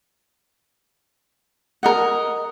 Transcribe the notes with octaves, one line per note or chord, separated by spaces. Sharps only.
A#4 D#5 F#5